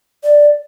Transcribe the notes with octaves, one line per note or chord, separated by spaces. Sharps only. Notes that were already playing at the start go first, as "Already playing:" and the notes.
D5